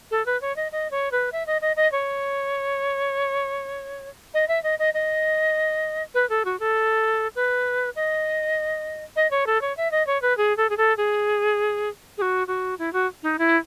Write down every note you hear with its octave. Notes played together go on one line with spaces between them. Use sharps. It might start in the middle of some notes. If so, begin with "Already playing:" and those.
A4
B4
C#5
D#5
D#5
C#5
B4
E5
D#5
D#5
D#5
C#5
D#5
E5
D#5
D#5
D#5
B4
A4
F#4
A4
B4
D#5
D#5
C#5
A4
C#5
E5
D#5
C#5
B4
G#4
A4
G#4
A4
G#4
G#4
F#4
F#4
E4
F#4
D#4
E4